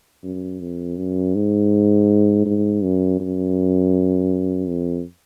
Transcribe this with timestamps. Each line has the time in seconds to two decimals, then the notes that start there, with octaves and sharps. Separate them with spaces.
0.23 F#2
0.60 F2
0.97 F#2
1.35 G#2
2.46 G#2
2.83 F#2
3.20 F#2
4.68 F2